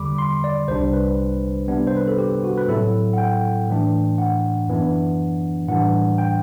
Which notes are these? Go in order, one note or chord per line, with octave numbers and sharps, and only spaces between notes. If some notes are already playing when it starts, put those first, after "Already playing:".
Already playing: E2 D3 G3 B5 D6
C6
D5
C2 C3 G3 D4 C5
B4
C3 G3 B3 D4
C5
B4
A4
G4
F#4
B4
A2 F#3 C4 E4 A4
F#5
G5
A2 E3 A3 D4
F#5
F#2 E3 B3 D4
A2 E3 G3 D4 F#5
G5